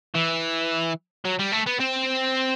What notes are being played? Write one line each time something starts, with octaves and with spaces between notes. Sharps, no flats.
E3
F#3
G3
A3
B3
C4